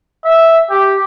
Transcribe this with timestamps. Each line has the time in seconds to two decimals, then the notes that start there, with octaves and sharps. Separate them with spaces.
0.25 E5
0.70 G4